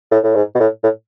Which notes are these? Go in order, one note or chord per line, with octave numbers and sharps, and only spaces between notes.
A2
A2
G#2
B2
A2
A2